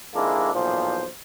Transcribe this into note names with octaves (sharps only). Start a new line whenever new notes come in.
F2 G#2 G#3 A#3 D4 E4
B1 E2 A#2 F3 C5